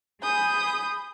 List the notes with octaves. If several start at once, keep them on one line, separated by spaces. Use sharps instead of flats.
G#4 G#5 B5 D#6 G6